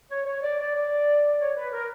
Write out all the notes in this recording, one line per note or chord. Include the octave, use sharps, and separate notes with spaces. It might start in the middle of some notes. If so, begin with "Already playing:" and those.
C#5
C#5
D5
D5
D5
C#5
B4
A#4